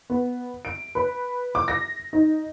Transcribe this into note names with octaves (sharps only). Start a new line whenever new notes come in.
B3
D7
B4
D6
A#6
D#4